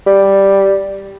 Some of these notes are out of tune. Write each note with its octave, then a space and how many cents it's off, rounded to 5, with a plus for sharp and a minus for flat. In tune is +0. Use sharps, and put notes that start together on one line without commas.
G3 +0